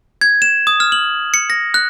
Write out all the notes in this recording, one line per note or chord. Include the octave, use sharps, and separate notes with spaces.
G#6
E7
D#6
F6
F#7
C#7
A#6
F#6